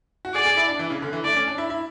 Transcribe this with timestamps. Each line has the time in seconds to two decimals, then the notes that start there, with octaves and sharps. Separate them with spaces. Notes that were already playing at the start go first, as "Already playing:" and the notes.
0.25 F#4
0.34 G#4 D5
0.46 G#4
0.57 E4
0.68 D4
0.79 E3
0.90 C#3
1.02 D3
1.13 E3
1.24 A3 D5
1.36 C#4
1.48 D4
1.58 E4
1.70 E4